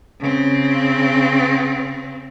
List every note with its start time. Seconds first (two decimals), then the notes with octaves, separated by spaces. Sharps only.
0.20 C#3 C4